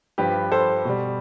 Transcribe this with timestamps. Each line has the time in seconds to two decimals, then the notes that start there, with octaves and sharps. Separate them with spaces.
0.18 G2 F3 G4 B4
0.52 A4 C5
0.85 B2 G3